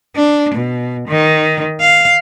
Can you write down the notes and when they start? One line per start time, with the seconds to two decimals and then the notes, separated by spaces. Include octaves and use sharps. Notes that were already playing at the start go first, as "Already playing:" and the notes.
0.16 D4
0.55 B2
1.08 D#3
1.81 F5